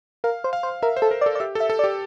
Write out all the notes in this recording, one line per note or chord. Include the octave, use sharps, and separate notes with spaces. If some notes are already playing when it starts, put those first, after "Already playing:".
A#4 F5
C5
F5
C5
A#4 E5
C5
A4
A#4
D5
A4
D5
G4 E5
A4 E5
A4
D5
G4